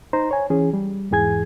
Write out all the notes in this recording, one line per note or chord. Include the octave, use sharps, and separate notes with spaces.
D#4 C5 A#5
C#5 G#5
E3 C#4 G#4
G3
E2 G#2 E3 G#4 G#5 G#6